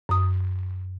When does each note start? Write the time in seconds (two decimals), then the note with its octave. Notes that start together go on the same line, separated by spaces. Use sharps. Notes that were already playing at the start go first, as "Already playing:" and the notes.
0.09 F#2 D#6